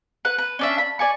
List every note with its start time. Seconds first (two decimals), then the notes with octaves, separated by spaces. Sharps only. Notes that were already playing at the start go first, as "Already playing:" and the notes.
0.25 B4 F#5
0.38 B4
0.59 C#4 D4 E5
0.78 B5
0.99 D5 G#5 C#6